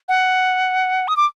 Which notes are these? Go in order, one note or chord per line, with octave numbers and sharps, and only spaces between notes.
F#5
D#6
D6